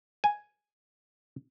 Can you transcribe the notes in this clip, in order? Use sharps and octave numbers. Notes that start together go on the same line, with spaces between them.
G#5